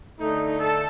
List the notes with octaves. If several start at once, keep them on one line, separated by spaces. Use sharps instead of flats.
D3 A3 D#4
A4